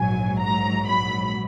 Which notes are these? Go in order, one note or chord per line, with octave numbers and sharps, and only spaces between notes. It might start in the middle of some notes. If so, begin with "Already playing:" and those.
Already playing: A#1 G#2 F#3 G#5
A#5
B5